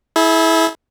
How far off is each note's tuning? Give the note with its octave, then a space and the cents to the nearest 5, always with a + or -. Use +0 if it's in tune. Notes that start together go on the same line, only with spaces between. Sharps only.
E4 -15 G#4 +45